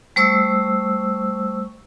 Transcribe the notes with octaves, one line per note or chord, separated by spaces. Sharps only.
G3 A3 C5 C#6 E6